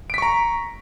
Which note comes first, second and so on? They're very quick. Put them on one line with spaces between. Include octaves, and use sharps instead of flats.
D7 B6 C#6 A#5